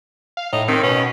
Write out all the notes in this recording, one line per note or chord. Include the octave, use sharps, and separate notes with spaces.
F5
A2 D#4
D#3 C4
B2 C#4